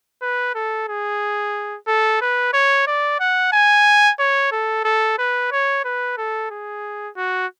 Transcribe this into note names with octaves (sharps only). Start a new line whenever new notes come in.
B4
A4
G#4
A4
B4
C#5
D5
F#5
G#5
C#5
A4
A4
B4
C#5
B4
A4
G#4
F#4